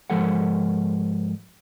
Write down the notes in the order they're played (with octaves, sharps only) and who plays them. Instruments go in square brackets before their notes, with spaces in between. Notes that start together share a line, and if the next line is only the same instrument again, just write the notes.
[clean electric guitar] G#2 F3 G#3 A4 A#4 F#5